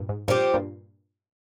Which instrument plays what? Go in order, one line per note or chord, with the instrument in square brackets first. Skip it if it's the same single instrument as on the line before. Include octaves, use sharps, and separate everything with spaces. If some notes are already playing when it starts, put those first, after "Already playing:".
Already playing: [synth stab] G2 A#2
G#2
[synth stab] G2 A#2 [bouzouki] F3 C4 G4
[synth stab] G2 A#2